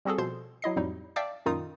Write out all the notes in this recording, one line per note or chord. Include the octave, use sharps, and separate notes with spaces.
G3 C4 F#4 G#4 A4
B2 F3 C5 C6 G6
F#3 E4 D#5 C7
F2 A2 F#3 G3 D#4
D5 E5 F5 G5 A5 D6
F#2 A#2 D#3 D#4 F4 D#6